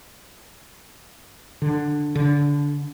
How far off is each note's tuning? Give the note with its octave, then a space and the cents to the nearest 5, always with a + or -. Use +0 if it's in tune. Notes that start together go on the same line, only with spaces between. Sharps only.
D3 +5
D3 -20